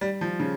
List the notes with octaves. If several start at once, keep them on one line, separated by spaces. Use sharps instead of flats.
G3
F3
C#3